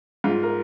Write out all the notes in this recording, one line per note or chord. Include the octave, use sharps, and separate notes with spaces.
G#2 F4
A#4